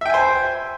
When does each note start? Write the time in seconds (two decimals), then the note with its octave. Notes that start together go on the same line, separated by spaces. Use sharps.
0.01 E5
0.05 G5
0.10 G#5
0.14 C5